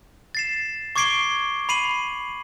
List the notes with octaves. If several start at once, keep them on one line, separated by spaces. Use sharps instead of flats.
A6 C7 E7
C#6 D6 G#6 C7 D7 G7
B5 C7 D#7 F#7